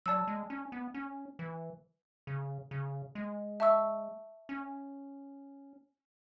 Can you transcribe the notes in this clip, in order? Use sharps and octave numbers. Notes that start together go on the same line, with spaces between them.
F#3 D5 A5 E6
G#3
C#4
B3
C#4
E3
C#3
C#3
G#3
E5 A5 C#6 E6
C#4